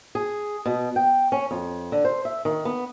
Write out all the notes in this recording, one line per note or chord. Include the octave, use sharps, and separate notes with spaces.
G#4
B2
G5
C#4
F2
D3
C5
E5
D#3
B3